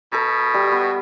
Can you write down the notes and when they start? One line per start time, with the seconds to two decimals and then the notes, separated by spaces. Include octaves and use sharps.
0.12 B2 A4 A#5
0.54 G3 E5
0.72 B3